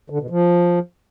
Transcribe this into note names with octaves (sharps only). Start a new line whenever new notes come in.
D3
B2
F3